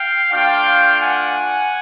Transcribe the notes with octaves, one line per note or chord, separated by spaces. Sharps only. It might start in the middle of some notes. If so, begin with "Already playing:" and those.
Already playing: F5 G5
A3 D4 F4 F5 G5
F#5 G#5